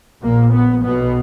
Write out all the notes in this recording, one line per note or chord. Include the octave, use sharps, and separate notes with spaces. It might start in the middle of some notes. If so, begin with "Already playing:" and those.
A#1 A#2 A#3
B3
B1 B2 B3